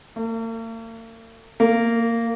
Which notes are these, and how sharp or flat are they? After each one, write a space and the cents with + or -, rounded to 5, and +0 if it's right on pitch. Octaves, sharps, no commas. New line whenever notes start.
A#3 -45
A#3 -15